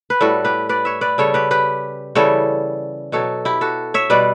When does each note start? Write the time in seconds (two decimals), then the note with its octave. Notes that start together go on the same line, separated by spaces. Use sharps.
0.10 B4
0.21 A2 G3 F#4 A4
0.45 G4 B4
0.69 B4 D5
0.85 C#5 E5
1.01 B4 D5
1.18 C#3 G3 A4 C#5
1.34 G4 B4
1.51 G4 B4
2.15 C#3 E3 G3 A4 C#5
3.12 B2 F#3 A4 C#5
3.45 E4 G4
3.61 F#4 A4
3.94 C#5 E5
4.10 B2 G3 B4 D5